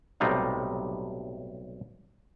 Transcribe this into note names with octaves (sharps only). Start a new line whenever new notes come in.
B1 A2 C3 G3 D#4 F5